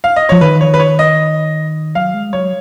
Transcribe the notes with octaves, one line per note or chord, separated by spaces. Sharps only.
F5
D#5
F3 C#5
D#3 B4
C#5
B4
C#5
D#5
F#3 F5
G#3
F#3 C#5